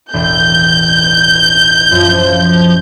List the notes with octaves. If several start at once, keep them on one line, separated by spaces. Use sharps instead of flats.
E1 A1 G6
F#2 F3